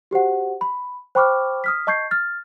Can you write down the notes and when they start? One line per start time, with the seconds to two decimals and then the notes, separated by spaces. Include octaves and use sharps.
0.11 F#4 G4 C5 F#5
0.61 B5
1.15 C5 G5 B5 C#6 D6 F6
1.64 D#6 F6 B6
1.87 D#5 A5 C#6 G6 G#6 C7
2.11 F6 A6